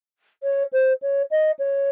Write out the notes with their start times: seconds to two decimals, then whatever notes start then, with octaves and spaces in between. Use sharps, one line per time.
0.43 C#5
0.73 C5
1.02 C#5
1.31 D#5
1.59 C#5